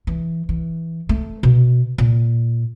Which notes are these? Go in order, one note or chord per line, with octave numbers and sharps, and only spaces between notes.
E3
E3
A3
B2
A#2